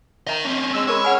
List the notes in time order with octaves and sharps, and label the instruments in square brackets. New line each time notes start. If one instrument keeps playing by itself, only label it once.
[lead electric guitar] A#4 D#5 [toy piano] E5 A#5
[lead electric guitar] C4 C#4
[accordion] G#3 E6
[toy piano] G#4 A#4 B5 [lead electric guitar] C#5
[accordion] C#4 F6 [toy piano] G#4 F#5 G#5